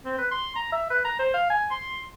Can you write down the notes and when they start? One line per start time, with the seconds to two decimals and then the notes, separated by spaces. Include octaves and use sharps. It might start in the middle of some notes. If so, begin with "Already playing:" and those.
0.05 C4
0.18 B4
0.31 C6
0.55 A#5
0.72 E5
0.90 B4
1.05 A#5
1.19 C5
1.34 F5
1.50 G#5
1.71 C6